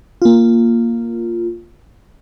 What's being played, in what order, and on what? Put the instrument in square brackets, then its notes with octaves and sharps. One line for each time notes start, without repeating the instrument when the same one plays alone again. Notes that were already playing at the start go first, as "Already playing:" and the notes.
[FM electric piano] A#3 F4